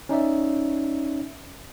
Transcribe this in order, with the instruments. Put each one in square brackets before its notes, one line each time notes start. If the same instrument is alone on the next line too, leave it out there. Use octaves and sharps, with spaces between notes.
[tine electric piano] C#4 D#4 D5 E5